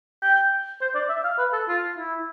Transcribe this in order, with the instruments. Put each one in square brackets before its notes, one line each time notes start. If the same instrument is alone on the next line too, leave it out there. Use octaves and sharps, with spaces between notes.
[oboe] G5
C5
D5
E5
F5
B4
A4
F4
E4